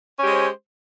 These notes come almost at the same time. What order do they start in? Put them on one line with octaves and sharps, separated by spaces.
C#4 G4 G#3 C5